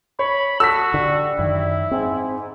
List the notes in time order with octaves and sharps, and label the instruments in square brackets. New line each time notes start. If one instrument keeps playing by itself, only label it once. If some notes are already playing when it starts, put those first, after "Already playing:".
[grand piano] C#5 [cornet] B5
[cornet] F#4 [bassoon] A4 [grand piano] E6 B6
[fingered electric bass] D3 [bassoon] G3
[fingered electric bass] F#2 D#3 [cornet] E4
[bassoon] G#2 [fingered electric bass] C4